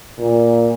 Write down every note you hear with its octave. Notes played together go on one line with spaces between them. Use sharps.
A#2